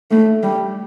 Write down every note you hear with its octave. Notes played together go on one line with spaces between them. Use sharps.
A3
G3